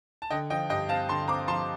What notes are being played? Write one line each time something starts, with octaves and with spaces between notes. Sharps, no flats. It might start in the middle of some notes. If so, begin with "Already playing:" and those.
A5
D3 D#5 G5
F3 D#5 G5
G2 D#5 G5
C4 F5 A5
D3 A5 C6
C4 A#5 D6
F3 A5 C6